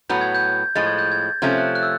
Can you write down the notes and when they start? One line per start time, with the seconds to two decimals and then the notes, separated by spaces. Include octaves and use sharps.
0.09 A2 F#3 B3 G6
0.21 G#6
0.35 G6
0.75 A2 F3 G#3 A6
0.87 G#6
0.99 G6
1.12 G#6
1.42 C3 F3 A3 C#4 G#6
1.58 F#6
1.75 F#6
1.83 E6